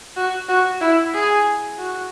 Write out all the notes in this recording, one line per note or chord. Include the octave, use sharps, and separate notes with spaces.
F#4
F#4
E4
G#4
F#4